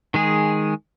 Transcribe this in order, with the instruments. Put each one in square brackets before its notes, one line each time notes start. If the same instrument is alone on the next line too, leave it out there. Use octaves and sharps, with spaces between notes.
[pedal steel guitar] D#3 G#3 G#4